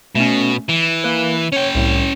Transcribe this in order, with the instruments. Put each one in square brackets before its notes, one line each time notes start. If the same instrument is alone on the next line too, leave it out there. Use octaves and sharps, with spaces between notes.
[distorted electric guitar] B2 [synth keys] A3 C#4
[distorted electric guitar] E3 [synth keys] E7
[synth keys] A#3 B4
[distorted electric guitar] C#4 G5 [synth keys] C#5
[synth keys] C2 A2